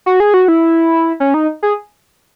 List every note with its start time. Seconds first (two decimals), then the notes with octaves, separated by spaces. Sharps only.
0.06 F#4
0.20 G#4
0.34 F#4
0.48 E4
1.20 C#4
1.34 D#4
1.63 G#4